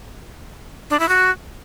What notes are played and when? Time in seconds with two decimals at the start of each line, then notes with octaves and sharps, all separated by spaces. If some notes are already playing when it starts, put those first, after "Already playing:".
0.90 D4
1.00 E4
1.09 F#4